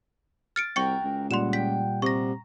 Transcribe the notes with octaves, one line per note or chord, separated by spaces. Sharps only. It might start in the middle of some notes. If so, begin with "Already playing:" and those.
F6 A6 C#7 D7
C2 F#4 A#4 G5 C#6 C#7
C#2
A#2 G3 F#5 C6 E7
G5 B6
C3 A#5 C#6 A#6